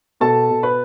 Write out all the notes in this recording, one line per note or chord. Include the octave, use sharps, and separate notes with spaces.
B2 A4 A5
B2
B4 B5